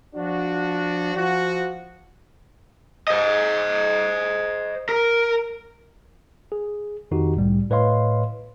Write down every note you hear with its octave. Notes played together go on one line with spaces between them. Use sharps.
F3 D4 F#4
F3 F#4
C5 D#5
A#4
G#4
F2 D#3 D#4 F#4 G4
C2 A2 G3
A2 B4 C#5 D#5 F5 C6